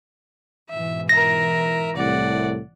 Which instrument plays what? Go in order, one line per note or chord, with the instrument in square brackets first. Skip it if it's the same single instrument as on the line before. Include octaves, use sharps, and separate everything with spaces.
[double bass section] G#2 B2 E3 [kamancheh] E5
[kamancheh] A#4 E5 [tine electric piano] A#6
[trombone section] C2 A2 [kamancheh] D5 F#5